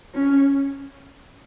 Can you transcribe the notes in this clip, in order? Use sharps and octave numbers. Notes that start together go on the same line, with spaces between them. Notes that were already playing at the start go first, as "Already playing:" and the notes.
C#4